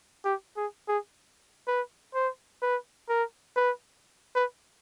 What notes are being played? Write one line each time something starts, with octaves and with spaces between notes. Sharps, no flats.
G4
G#4
G#4
B4
C5
B4
A#4
B4
B4